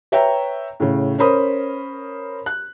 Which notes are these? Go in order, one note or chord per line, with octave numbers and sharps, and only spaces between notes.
B4 C#5 E5 G5 A#5
A2 C#3
C#4 A#4 C5 B5 D#6
F#6